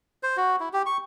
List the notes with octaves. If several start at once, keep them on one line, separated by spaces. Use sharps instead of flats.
C5
F#4
E4
G4
C#6